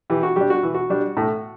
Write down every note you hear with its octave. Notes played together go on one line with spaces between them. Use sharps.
E3 G4
F#4
G3 D4 G4
F#4
E3
F#4
G3 D4
A2